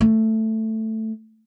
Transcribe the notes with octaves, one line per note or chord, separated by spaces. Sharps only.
A3